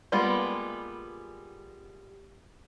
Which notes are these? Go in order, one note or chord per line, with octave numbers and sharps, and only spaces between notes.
G3 G#3 A#3 B3 F4